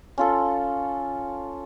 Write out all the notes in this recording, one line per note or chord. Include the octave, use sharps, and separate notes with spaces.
C#4 F4 A4